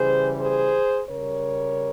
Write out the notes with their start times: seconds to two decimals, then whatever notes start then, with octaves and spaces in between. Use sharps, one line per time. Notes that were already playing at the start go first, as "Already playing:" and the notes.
Already playing: C#3 E3 G3 G#4 C5
0.39 G#4 C5
1.09 C#3 G3 A#4 C#5